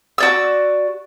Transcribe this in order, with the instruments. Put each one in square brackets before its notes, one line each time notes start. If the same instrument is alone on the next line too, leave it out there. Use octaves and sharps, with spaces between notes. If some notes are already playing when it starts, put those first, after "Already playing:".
[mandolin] F#4 D5 E6